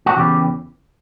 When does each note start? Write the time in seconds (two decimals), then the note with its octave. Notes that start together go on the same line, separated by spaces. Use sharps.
0.06 F#4
0.16 E2 C#3 E3 G4